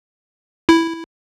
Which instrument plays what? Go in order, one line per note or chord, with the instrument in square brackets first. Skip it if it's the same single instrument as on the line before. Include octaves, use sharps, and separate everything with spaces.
[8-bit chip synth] E4